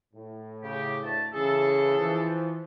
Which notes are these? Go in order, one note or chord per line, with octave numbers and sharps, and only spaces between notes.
A2
C#3 G4
D2 A3 A5
C#3 E3 G#4 A4
E3 F3